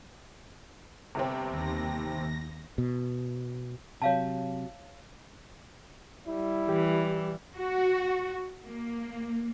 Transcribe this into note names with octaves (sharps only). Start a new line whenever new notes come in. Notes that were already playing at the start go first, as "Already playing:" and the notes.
G1 C3 C4
D#2 A#6
B2
C3 F#3 C#5 F5 A5
G3 E4
E3 G4
F#4
A#3